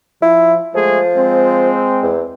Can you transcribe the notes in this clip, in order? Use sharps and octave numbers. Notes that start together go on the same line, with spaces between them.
F3 E4
F3 G#3 A3 G#4
G#3 C4
E2